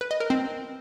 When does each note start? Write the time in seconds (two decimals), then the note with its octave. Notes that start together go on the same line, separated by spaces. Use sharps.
0.01 B4
0.11 D#5
0.20 A#4
0.30 C4